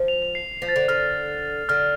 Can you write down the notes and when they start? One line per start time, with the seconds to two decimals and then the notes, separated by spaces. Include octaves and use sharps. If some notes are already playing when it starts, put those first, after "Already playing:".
Already playing: F3
0.08 F7
0.22 F7
0.35 C7
0.62 F3
0.69 A6
0.76 D3
0.88 D3 F6
1.69 D3 F6